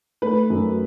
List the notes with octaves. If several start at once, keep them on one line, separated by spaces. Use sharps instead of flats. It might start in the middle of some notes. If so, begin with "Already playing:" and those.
A3 B4
F#2